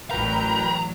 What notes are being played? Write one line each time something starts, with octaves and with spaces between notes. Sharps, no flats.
A1 F#3 A#4 B4 G5 A#5